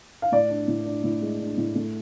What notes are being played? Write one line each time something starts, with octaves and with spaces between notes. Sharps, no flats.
F5
A2 D5
D4
A2
D4
A2
G#3
D4
A2
A3